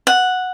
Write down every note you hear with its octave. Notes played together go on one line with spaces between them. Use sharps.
F#5